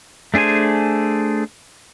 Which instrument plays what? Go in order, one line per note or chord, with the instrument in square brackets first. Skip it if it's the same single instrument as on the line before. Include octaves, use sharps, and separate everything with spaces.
[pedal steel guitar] A3 D4 G#4 C5 G#5